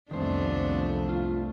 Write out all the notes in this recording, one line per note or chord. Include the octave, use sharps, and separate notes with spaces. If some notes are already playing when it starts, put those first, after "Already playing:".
C2 F2 D#3 A3 B3 C4 D4 C5
F4